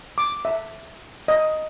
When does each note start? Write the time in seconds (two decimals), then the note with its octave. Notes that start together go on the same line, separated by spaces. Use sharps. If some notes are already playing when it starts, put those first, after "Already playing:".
0.18 D6
0.45 E5
1.28 D#5